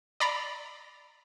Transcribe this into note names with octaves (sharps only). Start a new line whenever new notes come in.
D5 A#5 B5